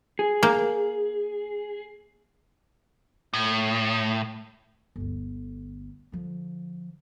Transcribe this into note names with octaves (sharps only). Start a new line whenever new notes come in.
G#4
A#3
A2
G1 D2
D3 F3